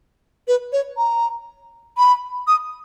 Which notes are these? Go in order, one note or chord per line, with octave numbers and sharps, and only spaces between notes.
B4
C#5
A#5
B5
D#6